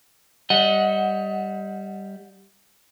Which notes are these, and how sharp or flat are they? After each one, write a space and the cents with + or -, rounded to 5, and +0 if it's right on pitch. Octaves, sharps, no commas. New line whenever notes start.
G3 +0 D#5 +25 F#5 -10